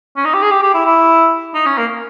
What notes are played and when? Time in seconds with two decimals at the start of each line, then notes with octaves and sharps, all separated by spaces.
0.16 C#4
0.25 D#4
0.34 G4
0.42 G#4
0.51 G4
0.62 G4
0.74 E4
0.86 E4
1.55 D#4
1.66 C#4
1.77 A#3